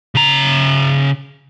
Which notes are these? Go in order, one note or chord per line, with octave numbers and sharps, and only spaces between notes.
C#3 A#5